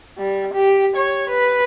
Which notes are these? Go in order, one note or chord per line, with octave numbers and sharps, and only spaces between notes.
G3
G4
C#5
B4